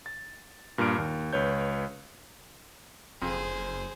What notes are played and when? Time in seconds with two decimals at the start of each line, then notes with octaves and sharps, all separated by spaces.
0.06 A6
0.78 G2 A#2 A#5 F6 D7
0.98 D#2
1.33 C#2 B4 C#5 G6
3.22 F#1 F2 G#4 C5